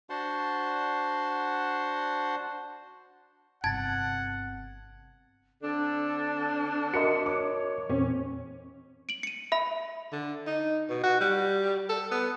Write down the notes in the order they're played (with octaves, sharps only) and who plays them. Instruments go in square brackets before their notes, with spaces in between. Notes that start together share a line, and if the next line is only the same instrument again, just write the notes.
[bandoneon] D4 F#4 C5 F#5 A5 C6
[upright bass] G1 C3 [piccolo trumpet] F#5 [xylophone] A5 [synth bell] G#6 A6
[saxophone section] D3 C4 D4 [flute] A4
[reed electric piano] F#4 A#4 D#5 [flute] E5 [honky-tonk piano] C6 C#7
[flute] C#5 [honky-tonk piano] D6
[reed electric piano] E2 A#2 C4 [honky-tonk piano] C#4
[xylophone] D7 F#7
C#7 D#7
E5 B5
[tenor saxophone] D3
D#4
B2
F#4
G3
A4
B3